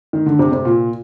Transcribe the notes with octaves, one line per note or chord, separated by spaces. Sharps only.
D#3
D3
C3
C3
A#2